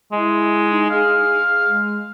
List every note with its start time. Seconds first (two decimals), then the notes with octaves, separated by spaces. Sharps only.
0.12 G#3 E4
0.70 D#4
0.90 G#4 F5
1.65 G#3